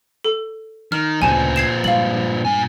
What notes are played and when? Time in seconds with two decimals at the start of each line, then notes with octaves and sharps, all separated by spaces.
0.24 A4
0.92 D#3 F6
1.22 D2 A#2 C#3 C4 G#5 A5
1.56 G#6 C7 E7
1.84 G2 G#3 F5 F#7
2.45 A#2 G#5